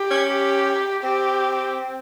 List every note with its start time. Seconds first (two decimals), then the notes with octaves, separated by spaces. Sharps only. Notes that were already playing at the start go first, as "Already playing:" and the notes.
Already playing: G4
0.11 C#4
0.30 G4
1.03 C4 G4